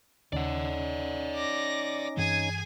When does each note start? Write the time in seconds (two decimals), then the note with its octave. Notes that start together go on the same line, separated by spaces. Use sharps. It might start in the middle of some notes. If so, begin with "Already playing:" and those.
0.33 D#2 C#3 C#4 D#4 D5 F#5
1.35 D6 A#6
2.17 G2 E3 C4 G#4 G#5